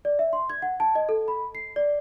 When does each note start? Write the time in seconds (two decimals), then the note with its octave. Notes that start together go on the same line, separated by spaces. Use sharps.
0.05 D5
0.19 E5
0.33 C6
0.50 G#6
0.62 F#5
0.80 A5
0.95 D#5
1.09 A4
1.28 B5
1.55 C7
1.76 D5